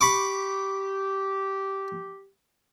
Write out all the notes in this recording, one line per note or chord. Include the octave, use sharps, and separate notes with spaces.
G4 B5 C#6 D6